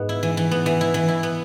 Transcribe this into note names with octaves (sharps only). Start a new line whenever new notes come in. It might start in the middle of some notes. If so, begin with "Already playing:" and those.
Already playing: G#2 B3
E4
E3
E3
B3
E3
E4
E3
E4
B3